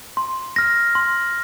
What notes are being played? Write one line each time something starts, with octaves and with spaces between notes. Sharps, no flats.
C6
F6 A#6
C6